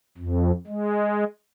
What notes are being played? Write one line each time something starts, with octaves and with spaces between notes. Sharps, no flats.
F2
G#3